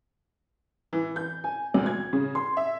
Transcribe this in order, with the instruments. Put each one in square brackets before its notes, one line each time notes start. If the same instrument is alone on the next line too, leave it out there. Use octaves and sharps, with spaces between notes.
[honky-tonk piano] E3
G6
G#5
D2
G#6
C#3
C6
E5